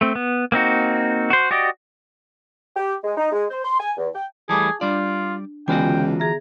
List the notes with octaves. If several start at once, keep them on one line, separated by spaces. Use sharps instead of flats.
A3 C4
B3
A#3 C4 D#4 F#4
F#4 C5
F#4 G4 D5 D#5
G4
G#3
D#4
G#3
C5
C6
G#5
E2
G5
E3 G3 A3 G#4 A5 D6
G3 D4 F4 D5
C#2 D3 E3 B3 F4 F#4 G5 G#5
G#4 E5 A#5